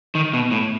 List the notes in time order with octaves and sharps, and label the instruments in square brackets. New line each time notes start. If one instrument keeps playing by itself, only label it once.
[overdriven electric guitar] D#3
B2
A2